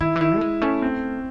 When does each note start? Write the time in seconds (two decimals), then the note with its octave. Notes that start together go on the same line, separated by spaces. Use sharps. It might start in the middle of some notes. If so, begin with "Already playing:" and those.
0.01 D#3 E4
0.16 E3
0.21 D#3 E4
0.36 A3
0.41 G#3
0.62 A3 C#4
0.82 C4